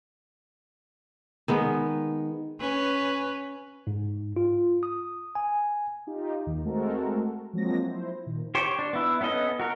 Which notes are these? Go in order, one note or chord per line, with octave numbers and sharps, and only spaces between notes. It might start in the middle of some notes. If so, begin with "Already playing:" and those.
D#3 G#3 B3
C#4 B4
G#2
F4
D#6
G#5
D#4 F4 G4
D#2 D#3
G#3 A3 C4 F#4 A4 A#4
F3 F#3 G#3 A#3 C4 A#6
E4 C5
A#2 D#3
G4 C5 C#5
D4
B3 E4
B3 C#4 A4 D#5
F#4 A#4